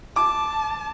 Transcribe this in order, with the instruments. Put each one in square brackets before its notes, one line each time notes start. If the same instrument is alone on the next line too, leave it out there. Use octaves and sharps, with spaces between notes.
[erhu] A5 [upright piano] D6